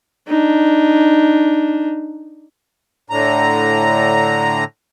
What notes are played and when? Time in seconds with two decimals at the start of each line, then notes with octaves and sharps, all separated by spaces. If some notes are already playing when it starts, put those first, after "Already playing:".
0.28 D4 D#4
3.10 A2 D3 A#5